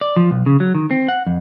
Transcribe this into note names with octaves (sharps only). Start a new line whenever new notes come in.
D5
F3
B1
C#3
F#3
D#3
C4
F#5
F2